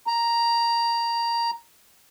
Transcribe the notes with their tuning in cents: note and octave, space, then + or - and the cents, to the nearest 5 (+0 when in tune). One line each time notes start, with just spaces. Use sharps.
A#5 +0